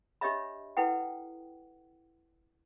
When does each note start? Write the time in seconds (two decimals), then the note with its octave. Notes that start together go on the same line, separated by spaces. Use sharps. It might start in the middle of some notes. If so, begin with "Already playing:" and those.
0.21 D4 G4 C#5 D#5 E5 B5
0.77 E4 A4 B4 F#5 G5